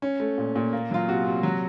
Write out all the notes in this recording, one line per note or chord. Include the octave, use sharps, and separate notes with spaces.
C#4
A3
A#2
A#2
A#3
F#3 F4
C3 F#4
C3
F#3